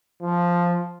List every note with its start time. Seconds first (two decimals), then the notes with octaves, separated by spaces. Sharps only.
0.22 F3